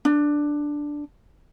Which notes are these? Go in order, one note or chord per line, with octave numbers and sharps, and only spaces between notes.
D4